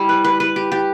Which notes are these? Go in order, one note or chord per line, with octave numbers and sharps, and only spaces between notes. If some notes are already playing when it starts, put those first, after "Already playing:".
Already playing: G3 E4
B4
B4
B4
G4
G4